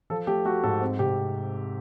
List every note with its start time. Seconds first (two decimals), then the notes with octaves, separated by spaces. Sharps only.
0.10 F3 A4
0.27 A3 G4
0.45 A3 F#4
0.63 G#2 A4
0.81 C4
0.99 C3 G4